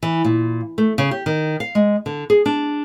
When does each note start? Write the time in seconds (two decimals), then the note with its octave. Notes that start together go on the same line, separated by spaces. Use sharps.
0.03 E3
0.25 A#2
0.78 A3
0.98 C#3
1.11 G4
1.26 D#3
1.60 F5
1.75 G#3
2.06 D3
2.30 G#4
2.46 D4